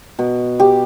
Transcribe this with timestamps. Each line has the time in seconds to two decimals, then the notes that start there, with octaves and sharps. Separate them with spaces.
0.19 B2
0.60 G4